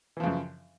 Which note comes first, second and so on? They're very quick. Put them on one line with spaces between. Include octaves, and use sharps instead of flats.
E3 F3 C#3 F#2